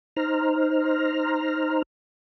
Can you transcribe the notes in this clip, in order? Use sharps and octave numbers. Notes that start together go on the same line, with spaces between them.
D#4 C5 A#5 F6